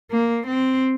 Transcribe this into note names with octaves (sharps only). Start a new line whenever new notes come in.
A#3
C4